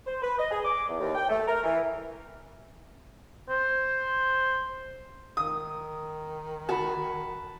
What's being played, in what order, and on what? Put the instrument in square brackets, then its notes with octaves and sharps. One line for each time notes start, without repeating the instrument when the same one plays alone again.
[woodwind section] C5
B4
D#5
G#4
D6
E2
D#2
G5
A3
A#4
E3
[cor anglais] C5
[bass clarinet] D#3 [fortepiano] D#6
[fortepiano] F#4 [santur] B4 A5